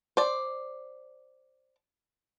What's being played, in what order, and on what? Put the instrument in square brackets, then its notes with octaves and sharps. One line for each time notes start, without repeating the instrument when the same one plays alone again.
[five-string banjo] C5 D5